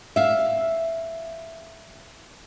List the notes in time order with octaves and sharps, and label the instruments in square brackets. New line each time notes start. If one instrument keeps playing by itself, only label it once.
[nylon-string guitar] E5 F5